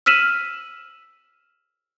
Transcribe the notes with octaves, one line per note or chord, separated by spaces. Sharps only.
E6 F6 B6 D#7 E7 F#7